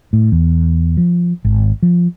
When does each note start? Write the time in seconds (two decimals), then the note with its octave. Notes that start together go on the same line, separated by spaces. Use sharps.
0.13 A2
0.32 E2
0.97 F3
1.45 G#1
1.82 F3